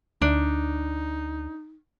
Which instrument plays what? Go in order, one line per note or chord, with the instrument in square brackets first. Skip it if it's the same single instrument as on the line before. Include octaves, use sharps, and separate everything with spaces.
[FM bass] D2 [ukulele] D4 [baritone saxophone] D#4